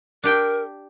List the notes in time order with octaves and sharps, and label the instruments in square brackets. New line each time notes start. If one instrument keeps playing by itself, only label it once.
[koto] D4 G4 G5 [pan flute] A#4